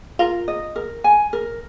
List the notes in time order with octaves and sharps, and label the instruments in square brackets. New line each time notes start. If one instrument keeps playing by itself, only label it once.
[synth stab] F4 [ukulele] A#4
[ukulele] D#5
A#4
G#5
A#4